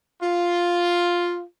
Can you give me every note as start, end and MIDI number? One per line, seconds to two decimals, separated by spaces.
0.21 1.42 65